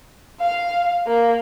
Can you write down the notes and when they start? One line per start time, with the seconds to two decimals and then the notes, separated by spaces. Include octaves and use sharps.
0.40 F5
1.07 A#3